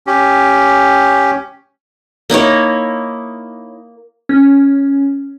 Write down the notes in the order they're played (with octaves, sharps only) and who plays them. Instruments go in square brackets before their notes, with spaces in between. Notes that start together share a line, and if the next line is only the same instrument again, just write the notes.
[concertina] C#4 G4
[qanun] A#3 D#4 E4 C#5
[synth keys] C#4